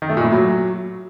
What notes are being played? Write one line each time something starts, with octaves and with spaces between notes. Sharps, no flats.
D#3
A3
A#2
A2
F#3